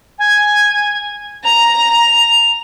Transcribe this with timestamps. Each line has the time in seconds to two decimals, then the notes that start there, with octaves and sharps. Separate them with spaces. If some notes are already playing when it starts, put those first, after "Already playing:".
0.19 G#5
1.45 A#5 F7